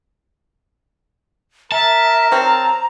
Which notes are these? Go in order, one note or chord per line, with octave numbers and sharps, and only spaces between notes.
A#4 E5 A5
F#3 C4 A#5